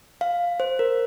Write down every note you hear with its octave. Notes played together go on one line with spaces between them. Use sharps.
F5
C5
A#4